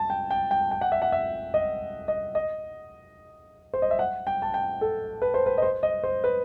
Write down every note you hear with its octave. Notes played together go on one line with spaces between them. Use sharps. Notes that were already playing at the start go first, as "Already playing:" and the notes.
Already playing: A5
G5
G5
G5
G5
F#5
E5
F#5
E5
D#5
D#5
D#5
C5
D#5
E5
F#5
G5
A5
G5
A4
B4
C5
B4
D#5
C5
D#5
C5
B4